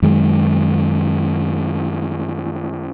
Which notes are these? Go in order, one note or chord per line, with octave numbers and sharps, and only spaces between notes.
F#2 D#3 G#3